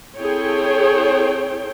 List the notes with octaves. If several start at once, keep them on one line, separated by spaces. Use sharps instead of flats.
C4 E4 G#4 A4 C#5 G5